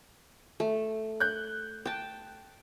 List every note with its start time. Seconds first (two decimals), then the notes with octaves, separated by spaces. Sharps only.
0.60 A3
1.20 F#6 G6
1.86 G5 A5